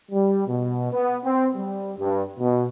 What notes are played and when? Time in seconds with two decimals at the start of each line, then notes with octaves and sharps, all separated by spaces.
0.11 G3
0.47 B2
0.92 B3
1.23 C4
1.56 G3
1.98 G2
2.40 B2